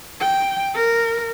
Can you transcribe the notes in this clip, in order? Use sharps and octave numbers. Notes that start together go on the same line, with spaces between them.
G5
A#4